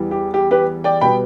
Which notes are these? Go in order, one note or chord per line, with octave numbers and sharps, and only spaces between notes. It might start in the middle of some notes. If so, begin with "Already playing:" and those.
Already playing: E2 E3 G3
G4
G4
G4 B4
D5 G5
B2 G3 B3 G5 B5